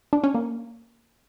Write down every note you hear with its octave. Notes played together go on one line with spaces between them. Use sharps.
D4
C#4
A#3